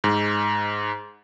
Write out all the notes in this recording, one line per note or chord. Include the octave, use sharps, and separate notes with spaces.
G#2